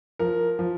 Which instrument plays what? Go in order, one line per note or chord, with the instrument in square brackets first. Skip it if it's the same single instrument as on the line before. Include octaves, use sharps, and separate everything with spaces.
[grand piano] F3 A#4
F3